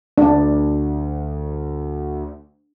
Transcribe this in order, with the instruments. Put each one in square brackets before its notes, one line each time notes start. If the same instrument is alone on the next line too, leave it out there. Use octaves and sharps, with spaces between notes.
[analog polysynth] D2 [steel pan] D4